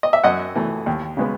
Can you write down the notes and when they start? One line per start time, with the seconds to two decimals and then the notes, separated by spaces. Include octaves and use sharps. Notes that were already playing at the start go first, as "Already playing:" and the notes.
0.03 D#5
0.13 E5
0.24 F#2 D#5 F#5
0.55 E3 A3
0.86 D#2
1.17 C#3 G#3 B3